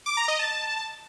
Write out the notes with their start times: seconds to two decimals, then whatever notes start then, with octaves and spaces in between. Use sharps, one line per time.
0.06 D6
0.17 A#5
0.28 D#5
0.39 A5